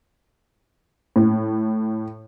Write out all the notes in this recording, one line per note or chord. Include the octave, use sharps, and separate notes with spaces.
A2